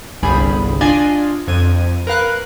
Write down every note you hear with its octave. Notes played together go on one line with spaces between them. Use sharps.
G1 C2 G3 G#4 B5
D4 F4 D5 D#5 G#5
F2 G#6 D#7
A#4 B4 F5 F#6